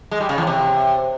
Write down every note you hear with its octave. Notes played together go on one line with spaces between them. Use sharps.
G#3
G3
C#3
E2
C3